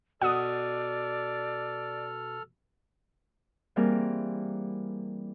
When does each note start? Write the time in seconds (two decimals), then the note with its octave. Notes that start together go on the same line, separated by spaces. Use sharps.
0.22 B2 A4 D5 F#5 D#6 F6
3.76 E3 G3 A#3 C4 G#4 A#4